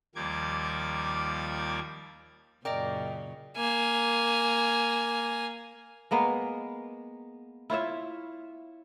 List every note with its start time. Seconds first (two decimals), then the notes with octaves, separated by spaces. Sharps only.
0.15 D#2 F3 G3 A#3 D6 G#6
2.65 F#2 A#2 C#3 A#4 D5 D#5 G5
3.57 A#3 G#5
6.11 G#3 A#3 B3
7.70 E4 F4 C#5 E5